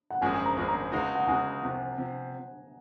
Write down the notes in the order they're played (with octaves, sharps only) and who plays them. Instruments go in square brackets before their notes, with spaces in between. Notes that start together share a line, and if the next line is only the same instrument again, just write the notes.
[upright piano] F#5
[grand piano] G#1 F#2 F3 G#3 [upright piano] G#5
[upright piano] G#5
A#5
[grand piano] G#1 F#2 F3 G#3
[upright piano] A#5
[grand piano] C#2 C#3 G#3 D#4 F#4
[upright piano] F#5
[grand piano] C#2 C#3 G#3 D#4 F#4 [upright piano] G#5
[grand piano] C2 C3 F3
C3 F3